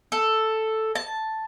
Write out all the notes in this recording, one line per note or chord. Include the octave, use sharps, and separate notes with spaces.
A4
A5